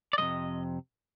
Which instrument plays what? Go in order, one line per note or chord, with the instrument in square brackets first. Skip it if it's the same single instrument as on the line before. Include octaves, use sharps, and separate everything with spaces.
[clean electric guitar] D5
F2 C3 F3 G#3 D#5